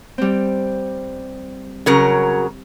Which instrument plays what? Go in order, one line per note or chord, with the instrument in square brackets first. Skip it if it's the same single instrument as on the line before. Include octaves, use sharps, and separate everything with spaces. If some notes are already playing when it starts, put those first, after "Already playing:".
[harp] G3 C4
[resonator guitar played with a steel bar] C#3 F#3 A#4